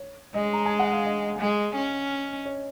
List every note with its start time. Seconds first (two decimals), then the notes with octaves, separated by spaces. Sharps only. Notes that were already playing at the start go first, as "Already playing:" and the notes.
Already playing: C#5
0.34 G#3 D#5
0.53 A#5
0.66 G#5
0.79 F#5
0.92 F5
1.05 D#5
1.39 G#3
1.75 C#4
2.45 C#5